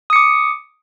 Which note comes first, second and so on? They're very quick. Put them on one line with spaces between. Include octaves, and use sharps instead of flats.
D#6 C#7 D6